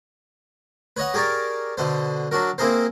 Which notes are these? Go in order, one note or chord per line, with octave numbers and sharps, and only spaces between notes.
B4 C#5 D#5 F#5
G4 G#4 A#4 C#5 D5
B2 D3 C5
F#3 D4 F#4 A#4
A#3 C4 E4 G#4 A#4 C5